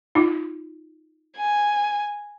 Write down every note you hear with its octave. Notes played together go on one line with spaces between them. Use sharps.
D#4 F4
G#5